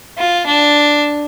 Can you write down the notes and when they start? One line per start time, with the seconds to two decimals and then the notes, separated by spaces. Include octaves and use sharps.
0.18 F4
0.47 D4